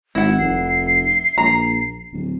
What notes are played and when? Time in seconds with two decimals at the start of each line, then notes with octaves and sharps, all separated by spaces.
0.15 G#1 E4 F#5
0.39 F1 C7
1.38 A#1 A#5
2.13 D1